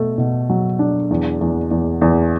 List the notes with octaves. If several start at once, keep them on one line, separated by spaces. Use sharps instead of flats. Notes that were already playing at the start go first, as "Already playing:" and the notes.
Already playing: B2 A3
B2
F#3
D4
E2
E2
E2
E2